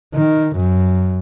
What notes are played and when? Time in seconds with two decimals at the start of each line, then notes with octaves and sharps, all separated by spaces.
0.15 D#3
0.56 F#2